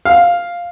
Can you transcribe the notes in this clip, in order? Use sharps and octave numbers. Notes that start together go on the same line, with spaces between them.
F5